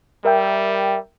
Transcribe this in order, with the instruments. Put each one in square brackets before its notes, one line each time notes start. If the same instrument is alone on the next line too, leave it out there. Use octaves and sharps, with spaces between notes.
[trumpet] G3 [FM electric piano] A#4 E5 G5